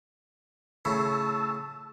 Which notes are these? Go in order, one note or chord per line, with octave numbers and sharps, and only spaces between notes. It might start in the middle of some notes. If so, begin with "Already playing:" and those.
A2 C#3 A5 E6